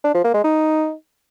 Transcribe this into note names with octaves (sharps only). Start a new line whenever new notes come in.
D4
F3
A#3
G#3
D#4